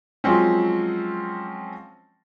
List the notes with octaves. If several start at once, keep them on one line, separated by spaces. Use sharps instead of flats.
F3 F#3 G#3 C4 C#4